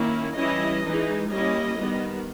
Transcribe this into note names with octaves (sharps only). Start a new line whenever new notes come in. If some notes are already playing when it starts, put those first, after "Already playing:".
Already playing: D#3 A#3 C#4 E4
E3 G3 C#4 E4 D#5
E3 G#3 D#4
G3 A#3 C#4 E4 D#5
D#3 G3 B3